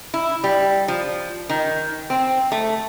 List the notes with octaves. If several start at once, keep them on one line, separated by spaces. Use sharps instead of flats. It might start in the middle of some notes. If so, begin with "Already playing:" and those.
E4
G3
F3
D#3
C4
A3